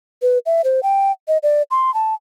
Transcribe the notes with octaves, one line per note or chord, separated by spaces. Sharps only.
B4
E5
C5
G5
D#5
D5
C6
A5